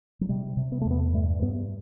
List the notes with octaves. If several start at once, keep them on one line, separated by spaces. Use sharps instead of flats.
F#3
C3 G3
C3
B3
A3
E2
B3
G2 A3
G2 B3